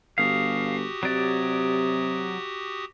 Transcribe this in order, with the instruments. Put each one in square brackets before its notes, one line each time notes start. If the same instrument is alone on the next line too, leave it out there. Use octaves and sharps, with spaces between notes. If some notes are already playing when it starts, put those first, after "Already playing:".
[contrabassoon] G1 [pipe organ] F#4 G4 D#6 [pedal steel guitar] F5
[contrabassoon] C3 [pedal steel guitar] F#3 D5